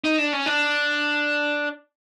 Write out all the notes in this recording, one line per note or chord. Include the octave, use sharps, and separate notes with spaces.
D#4
D4
C#4
D4